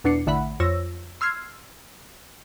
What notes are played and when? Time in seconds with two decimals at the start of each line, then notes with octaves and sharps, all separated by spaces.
0.04 E2 B2 D4 C7 C#7
0.27 A1 D3 E5 F#5 B5
0.60 F2 C#5 E6 A#6
1.21 C6 E6 F6 G#6 C7